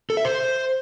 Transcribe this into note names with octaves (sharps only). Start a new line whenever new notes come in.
A4
E5
C5